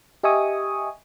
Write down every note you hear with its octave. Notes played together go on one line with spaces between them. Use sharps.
G4 D#5 E5 G#5 C#6 D#6